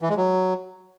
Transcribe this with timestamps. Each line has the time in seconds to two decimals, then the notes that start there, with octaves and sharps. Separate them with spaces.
0.02 E3
0.09 G#3
0.17 F#3